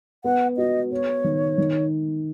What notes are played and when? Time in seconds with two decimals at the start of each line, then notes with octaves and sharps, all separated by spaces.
0.24 B3 F#5
0.57 F#4 D#5
0.91 B3 C#5
1.24 D#3
1.58 D#3